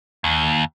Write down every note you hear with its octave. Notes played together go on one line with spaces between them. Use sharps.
D#2